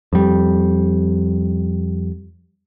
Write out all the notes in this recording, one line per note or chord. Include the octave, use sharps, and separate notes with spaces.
F2 G3